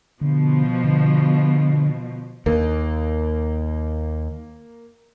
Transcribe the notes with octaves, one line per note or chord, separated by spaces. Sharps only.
B2 D3 F3
D3
D#2 A#3